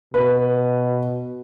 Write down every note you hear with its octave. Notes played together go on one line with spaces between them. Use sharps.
B2 B4